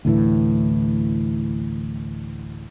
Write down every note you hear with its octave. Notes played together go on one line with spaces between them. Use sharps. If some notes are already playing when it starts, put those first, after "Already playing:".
D2 A2 E3